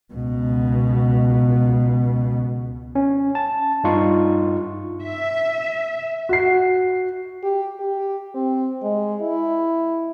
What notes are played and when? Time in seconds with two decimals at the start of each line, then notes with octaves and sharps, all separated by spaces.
0.13 C#2 B2
2.95 C#4
3.35 A5
3.84 G2 D#4 F4 C#6
5.02 E5
6.29 F#4 C7
7.43 G4
7.80 G4
8.34 C4
8.82 G#3
9.21 E4